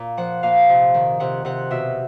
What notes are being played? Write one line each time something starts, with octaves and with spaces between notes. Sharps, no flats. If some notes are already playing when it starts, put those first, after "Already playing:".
Already playing: A#2
F3 F#5
A#2 F5
C3
D#3
C3 F#5
C3 F#5
B2 E5